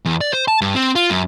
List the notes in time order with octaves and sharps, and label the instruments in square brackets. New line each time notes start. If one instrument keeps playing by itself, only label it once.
[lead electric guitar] E2
D5
C5
A5
G2
C4
F4
F#2